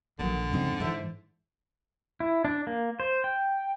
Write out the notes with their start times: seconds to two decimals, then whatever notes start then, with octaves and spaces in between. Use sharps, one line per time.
0.19 A#1 A#2 D3 D#3 F#3
0.51 F2 G#2 C#3 G#3 C4 D#4
0.80 G#2 E3 A4 C5 E5
2.20 E4
2.45 D4
2.67 A#3
3.00 C5
3.24 G5